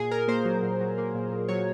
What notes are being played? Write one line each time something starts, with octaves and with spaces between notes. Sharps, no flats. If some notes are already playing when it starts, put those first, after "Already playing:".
Already playing: A#2 G#4
A#2 A#4
A#3 C5
F#3
A#2
F#3
A#3
A#2
A#2
F#3 C#5